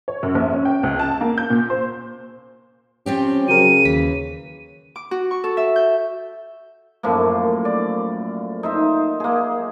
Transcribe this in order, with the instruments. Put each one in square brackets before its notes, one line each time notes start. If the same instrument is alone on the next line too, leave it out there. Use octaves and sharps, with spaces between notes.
[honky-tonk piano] C#5
F#2
A#1
C#4
G5
C#2
A5
A#3
G6
A#2
C5
[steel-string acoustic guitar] F3 C4 G4 [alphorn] C#4
[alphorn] C#3 [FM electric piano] F#3 A#4 [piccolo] D#7
[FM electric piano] D#2 B6 [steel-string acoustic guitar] E3
[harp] D6
F#4
C#6
A4
E5
G6
[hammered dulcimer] F#2 A2 F3 A#3
D5
D#4 C5 E5
A#3 G#4